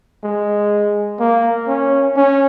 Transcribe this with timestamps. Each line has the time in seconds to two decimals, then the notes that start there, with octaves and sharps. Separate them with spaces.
0.23 G#3
1.20 A#3
1.68 C#4
2.16 C#4